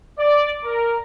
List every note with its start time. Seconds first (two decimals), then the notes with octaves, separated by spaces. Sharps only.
0.18 D5
0.65 A#4